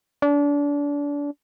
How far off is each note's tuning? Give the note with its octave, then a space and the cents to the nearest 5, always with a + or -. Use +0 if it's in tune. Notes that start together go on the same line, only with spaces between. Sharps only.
D4 -30